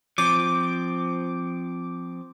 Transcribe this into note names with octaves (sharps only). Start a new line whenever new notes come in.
F3 C4 D6